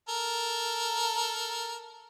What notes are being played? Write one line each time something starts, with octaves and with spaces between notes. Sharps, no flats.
A4 A#4